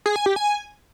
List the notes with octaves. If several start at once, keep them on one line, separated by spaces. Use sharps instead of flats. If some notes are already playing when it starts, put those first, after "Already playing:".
G#4
G#5
G4
G#5